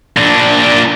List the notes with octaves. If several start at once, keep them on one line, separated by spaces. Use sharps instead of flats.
A#2 D4